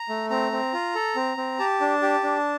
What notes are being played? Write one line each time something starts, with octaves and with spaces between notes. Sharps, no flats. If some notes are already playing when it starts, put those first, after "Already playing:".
Already playing: A#5
A3
C4 A#5
C4
F4
A4
C4
C4
G4 A5
D4
G4
D4